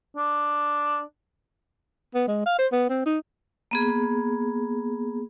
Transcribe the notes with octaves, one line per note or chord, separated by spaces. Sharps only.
D4
B3
G#3
F5
C5
B3
C4
D#4
A#3 B3 G#4